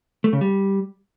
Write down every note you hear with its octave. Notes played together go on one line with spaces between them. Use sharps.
A3
C#3
G3